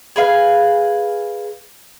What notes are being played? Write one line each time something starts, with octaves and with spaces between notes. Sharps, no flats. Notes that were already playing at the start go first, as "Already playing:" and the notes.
G#4 B4 F5